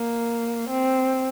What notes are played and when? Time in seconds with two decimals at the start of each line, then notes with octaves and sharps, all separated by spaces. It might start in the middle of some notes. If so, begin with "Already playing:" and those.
Already playing: A#3
0.70 C4